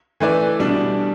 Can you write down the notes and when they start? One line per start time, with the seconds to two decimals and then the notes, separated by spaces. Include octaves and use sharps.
0.20 E3 A3 E4 B4 D5
0.60 B2 G3 D4